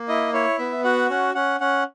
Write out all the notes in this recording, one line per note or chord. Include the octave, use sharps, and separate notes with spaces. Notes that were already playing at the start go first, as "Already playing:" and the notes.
Already playing: A#3
E4 D#5
E4 C#5
B3 E5
F#4 F#5
C#4 F#5
C#4 F#5
C#4 F#5